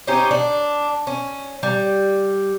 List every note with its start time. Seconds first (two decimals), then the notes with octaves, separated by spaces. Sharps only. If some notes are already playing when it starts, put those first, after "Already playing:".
0.07 C4 C#4 D#4 G4
0.31 D4
1.07 C#4
1.63 G3